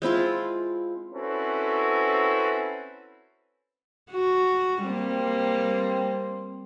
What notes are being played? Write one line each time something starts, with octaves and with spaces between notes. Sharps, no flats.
G#3 C4 E4 F4
C4 C#4 E4 F#4 A4 B4
F#4
G3 A#3 C4